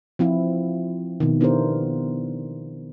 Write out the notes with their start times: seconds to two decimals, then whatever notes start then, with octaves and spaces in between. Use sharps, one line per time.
0.19 F3 C4 E4 F4
1.20 B2 D#3
1.41 B3 D4 E4 G4 A#4 C5